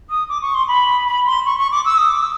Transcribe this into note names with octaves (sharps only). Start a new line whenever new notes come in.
D#6
D6
C#6
C6
B5
B5
C6
C#6
C#6
D6
E6
D#6
D6
E6